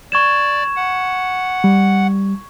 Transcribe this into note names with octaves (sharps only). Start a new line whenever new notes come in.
D5 C#6 G#6 E7
F#5
G3